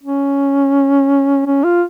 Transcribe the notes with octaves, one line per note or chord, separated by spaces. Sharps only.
C#4
C#4
F4